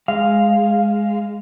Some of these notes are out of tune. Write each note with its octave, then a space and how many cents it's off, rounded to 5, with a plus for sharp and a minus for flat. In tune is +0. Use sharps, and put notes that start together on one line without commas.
G#3 +0 F5 +0